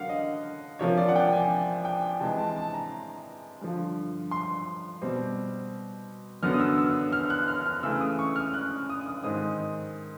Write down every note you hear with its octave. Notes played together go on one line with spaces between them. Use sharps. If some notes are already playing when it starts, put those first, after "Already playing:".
Already playing: D3 F#3 A#3 F5 F#5
D#5
C3 F3 A#3 C#5
D5
F#5
G5
G#5
G5
C3 E3 G#3 A5
A5
A5
A#5
G2 D3 F3
C6
B2 G3 C4
F#2 D3 F#3 B3 F6
D#6
E6
E6
F6
F#6
F6
F6
C#3 E3 A3 E6
D#6
C#6
F6
F#6
D#6
D#6
G#2 D#3 G#3 C4 D#6